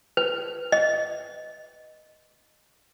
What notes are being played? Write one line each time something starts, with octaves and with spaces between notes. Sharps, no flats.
B4
D#5